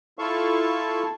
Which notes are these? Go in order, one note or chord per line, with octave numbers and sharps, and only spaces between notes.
E4 F4 A4 F5 A5 C#6